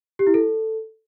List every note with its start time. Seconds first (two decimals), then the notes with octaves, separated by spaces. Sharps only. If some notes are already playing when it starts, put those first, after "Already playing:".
0.19 G4
0.27 E4
0.34 A4